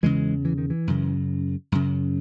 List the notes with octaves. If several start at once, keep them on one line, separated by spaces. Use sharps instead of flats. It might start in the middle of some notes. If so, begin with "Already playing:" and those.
E2 C#3 E3 G#3
E3
D#3
E3
F#2 C#3
F#2 C#3